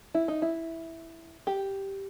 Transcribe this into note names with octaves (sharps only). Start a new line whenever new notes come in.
E4
D#4
E4
G4